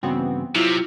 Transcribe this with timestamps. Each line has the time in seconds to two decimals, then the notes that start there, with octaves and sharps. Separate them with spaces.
0.03 G2 C#3 E3 B3 C4 F#4
0.56 C3 F#3 E4 F4 B6